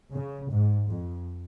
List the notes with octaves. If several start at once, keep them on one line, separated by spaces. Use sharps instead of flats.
C#3
G#2
F2